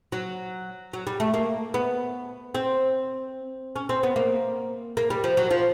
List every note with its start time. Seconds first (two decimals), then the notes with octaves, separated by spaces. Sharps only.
0.12 F#3
0.93 F#3
1.07 G3
1.20 A3
1.34 A#3
1.74 B3
2.55 C4
3.76 C#4
3.89 C4
4.03 B3
4.16 A#3
4.97 A#3
5.10 G3
5.24 F3
5.37 F#3
5.51 F3